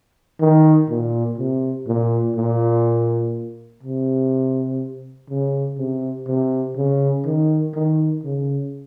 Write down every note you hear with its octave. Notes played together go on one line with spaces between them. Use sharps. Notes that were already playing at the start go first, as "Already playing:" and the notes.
D#3
A#2
C3
A#2
A#2
C3
C#3
C3
C3
C#3
D#3
D#3
C#3